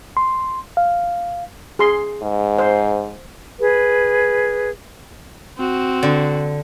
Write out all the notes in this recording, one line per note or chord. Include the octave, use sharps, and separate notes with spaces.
C6
F5
G#4 C6
G#2
C5
G#4 B4
C4 F#4
D3